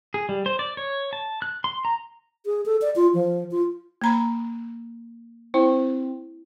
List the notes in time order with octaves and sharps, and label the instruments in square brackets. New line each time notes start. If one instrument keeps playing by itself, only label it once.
[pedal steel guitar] G#4
G3
C5
D5
C#5
A5
F#6
C6
A#5
[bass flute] G#4
A4
D5
F4
F3
F4
[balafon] A#3 A#5 B5
[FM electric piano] C4 [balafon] E4